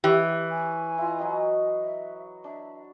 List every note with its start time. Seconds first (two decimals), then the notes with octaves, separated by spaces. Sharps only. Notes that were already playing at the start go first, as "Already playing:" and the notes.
0.04 E3 E4 G4 B4 C#5 F#5
0.49 G#5
0.98 E4 F4 A#5
1.19 F#3 F#4 D#5
1.82 E5
2.44 D4 E5